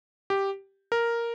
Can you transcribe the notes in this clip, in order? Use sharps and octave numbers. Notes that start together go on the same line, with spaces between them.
G4
A#4